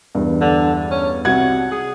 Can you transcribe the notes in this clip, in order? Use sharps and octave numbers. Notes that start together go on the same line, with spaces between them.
E2 G2
D3
C#4
C2 F#4 F#5 G#6
G#4